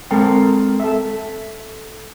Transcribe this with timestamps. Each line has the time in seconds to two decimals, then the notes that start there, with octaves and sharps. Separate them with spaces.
0.11 G#3 C4 A4 A#4 C5 G5
0.80 A4 E5